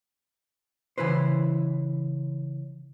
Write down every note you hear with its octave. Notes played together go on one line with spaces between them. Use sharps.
C#3 E3 E4 B4 C5